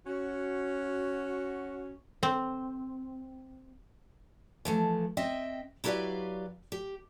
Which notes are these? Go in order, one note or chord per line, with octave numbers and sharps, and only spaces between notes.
C#4 F#4
C4
E3 F3 A3
C4 D#5 E5 G5
F#3 E4 G4 B4 D5 F5
G4